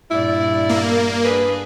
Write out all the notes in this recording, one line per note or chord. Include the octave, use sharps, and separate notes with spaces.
G2 A#2 E4 D5
A#3
D4 G#4 B4